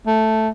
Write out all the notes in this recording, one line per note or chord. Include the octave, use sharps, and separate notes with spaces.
A3